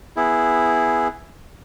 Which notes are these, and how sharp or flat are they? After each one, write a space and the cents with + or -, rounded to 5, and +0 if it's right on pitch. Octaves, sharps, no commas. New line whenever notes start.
B3 +0 E4 +0 G#4 +0